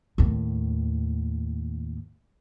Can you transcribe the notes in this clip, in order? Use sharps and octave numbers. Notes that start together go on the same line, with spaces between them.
D#2 A2